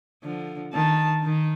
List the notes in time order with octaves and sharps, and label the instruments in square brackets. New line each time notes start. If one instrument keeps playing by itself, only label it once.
[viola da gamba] D3 F3
[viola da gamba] D#3 [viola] A5
[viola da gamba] D#3